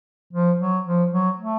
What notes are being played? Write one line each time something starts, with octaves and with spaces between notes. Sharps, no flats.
F3
F#3
F3
F#3
A3